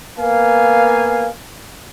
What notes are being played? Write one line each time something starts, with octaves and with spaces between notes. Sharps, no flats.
A#3 B3 F5 G#5